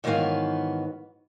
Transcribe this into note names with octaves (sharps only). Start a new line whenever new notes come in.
G#2 D#3 E3 F#3 B3 F5